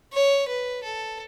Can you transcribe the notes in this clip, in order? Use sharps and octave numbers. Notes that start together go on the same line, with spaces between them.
C#5
B4
A4